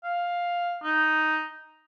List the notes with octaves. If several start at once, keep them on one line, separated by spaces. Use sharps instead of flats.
F5
D#4